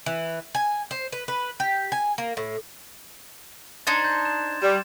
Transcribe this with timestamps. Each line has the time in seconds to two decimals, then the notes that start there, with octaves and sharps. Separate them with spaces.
0.06 E3
0.55 G#5
0.91 C5
1.12 B4
1.28 B4
1.60 G4
1.92 G#5
2.18 A#3
2.37 A2
3.87 D4 D#4 C5 C6 G#6 A6
4.04 C6 G6
4.25 E7
4.62 G3 E7